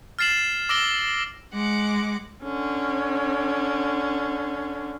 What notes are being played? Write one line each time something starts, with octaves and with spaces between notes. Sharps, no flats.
F6 A6 C7 E7 F#7
D6 E6 A#6 D7 F#7 G7
G#3 F#5 D6
D3 C#4